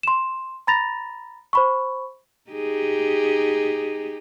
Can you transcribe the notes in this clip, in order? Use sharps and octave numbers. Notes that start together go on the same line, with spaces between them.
C6 E7
A#5 B5 A6 A#6 F7
C5 B5 C#6
D#4 G4 G#4